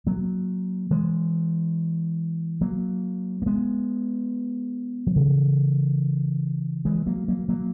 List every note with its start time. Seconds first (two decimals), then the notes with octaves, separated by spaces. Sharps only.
0.06 F#3 A#3
0.91 E3 G#3
2.61 F#3 A#3
3.42 A#3
3.46 G#3 B3
5.07 F#3
5.16 C#3 E3
6.85 E3 G#3
7.06 F#3 A#3
7.28 F#3 A#3
7.49 F#3 A#3